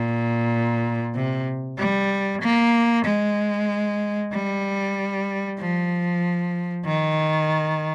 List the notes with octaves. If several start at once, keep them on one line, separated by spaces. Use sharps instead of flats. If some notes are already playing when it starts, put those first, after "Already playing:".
Already playing: A#2
C3
G3
A#3
G#3
G3
F3
D#3